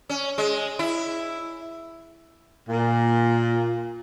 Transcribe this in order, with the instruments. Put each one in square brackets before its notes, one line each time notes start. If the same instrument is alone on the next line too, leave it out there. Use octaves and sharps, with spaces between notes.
[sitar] C#4
G#3
E4
[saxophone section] A#2